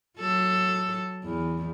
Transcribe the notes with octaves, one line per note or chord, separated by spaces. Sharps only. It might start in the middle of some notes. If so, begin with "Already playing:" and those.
F#3 A4
E2